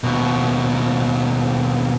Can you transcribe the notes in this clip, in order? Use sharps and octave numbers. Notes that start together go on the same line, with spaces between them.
D#2 B2